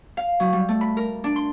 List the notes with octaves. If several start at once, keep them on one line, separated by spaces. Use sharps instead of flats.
F5
F#3
G3
A3
B5
A#4
D4
C6